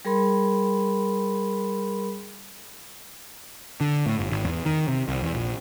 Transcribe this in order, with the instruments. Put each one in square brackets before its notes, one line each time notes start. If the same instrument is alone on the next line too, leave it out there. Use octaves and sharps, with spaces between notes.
[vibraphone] G3 G#4 A#4 B5 C6
[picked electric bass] D3
A2
G1
G#1
E2
D#3
C3
C2
E2
A#1